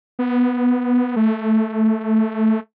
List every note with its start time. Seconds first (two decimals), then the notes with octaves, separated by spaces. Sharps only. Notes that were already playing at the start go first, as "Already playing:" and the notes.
0.19 B3
1.16 A3